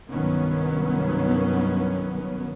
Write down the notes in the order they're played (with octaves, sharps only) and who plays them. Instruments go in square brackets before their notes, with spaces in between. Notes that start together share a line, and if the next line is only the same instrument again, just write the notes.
[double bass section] C2 G2 D#3 F#3 B3 C#4